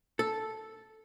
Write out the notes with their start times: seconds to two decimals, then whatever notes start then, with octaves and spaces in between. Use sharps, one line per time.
0.19 A4